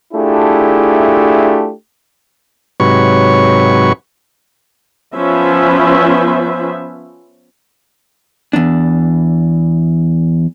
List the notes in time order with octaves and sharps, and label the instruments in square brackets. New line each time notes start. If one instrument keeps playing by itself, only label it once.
[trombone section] A3 D4 E4 F4 G4 G#4
[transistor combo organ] G#2 C3 F#3 B4 C#5 C#6
[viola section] F3 B3 C#4 B4 C5 E5
[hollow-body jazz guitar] E2 D4